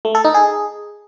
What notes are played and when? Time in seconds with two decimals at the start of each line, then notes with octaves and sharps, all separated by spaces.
0.05 A3
0.15 A4
0.25 D#4
0.34 G#4